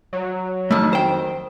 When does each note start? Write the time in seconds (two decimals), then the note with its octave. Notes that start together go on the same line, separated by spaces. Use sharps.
0.13 F#3
0.71 F2 D#3 A3
0.93 C5 G5